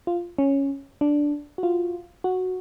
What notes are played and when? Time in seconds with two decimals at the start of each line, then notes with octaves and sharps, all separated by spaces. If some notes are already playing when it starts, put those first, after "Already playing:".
0.07 F4
0.38 C#4
1.01 D4
1.58 F#4
1.63 F4
2.24 F#4